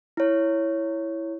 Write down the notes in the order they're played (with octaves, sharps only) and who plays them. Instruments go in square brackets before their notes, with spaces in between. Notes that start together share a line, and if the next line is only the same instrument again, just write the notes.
[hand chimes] E4 C#5